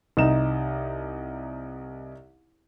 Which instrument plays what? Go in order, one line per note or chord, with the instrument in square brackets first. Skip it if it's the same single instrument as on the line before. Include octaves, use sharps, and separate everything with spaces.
[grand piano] C2 D#4 E7